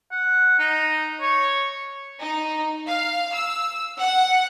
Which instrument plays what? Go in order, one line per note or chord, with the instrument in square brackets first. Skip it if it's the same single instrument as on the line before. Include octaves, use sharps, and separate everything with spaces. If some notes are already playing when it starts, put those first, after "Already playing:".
[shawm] F#5
D#4
C#5
[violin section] D#4
F5
E6
F#5